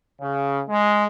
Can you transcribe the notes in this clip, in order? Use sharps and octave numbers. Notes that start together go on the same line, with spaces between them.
C#3
G#3